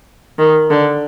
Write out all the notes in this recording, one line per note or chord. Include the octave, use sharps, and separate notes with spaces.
D#3
D3